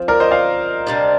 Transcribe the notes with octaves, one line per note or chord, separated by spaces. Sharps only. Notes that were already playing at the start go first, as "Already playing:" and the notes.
Already playing: F3 C4 F4
A#4 D5
C5 D#5
D5 F5
C3 G3 D4